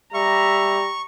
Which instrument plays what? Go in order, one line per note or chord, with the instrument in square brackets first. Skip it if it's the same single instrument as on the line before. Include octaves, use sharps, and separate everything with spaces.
[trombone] G3 [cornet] E5 [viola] A#5 [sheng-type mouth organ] C#6